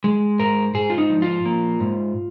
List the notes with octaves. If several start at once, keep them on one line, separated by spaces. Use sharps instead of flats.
G#3
G#2 A#4
G#2 G#4
F4
D#4
F3
F4
A#3
G#2